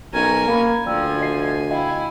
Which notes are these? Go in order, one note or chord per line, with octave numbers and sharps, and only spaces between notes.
B1 C#4 A#4 G#5
A#3 F5 A#5 B5
D2 F3 D5 G5 G#5 E6
D#5 C7
E4 D#5 F5 G5